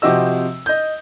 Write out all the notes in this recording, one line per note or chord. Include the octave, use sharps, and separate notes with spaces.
C3 F3 C4 F#4 D#5 E6
D#5 G6